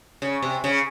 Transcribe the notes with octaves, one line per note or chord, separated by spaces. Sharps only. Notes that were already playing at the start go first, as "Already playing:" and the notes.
C#3
C3
C#3